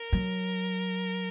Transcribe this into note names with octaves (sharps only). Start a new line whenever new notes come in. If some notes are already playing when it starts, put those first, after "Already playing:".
Already playing: A#4
F#3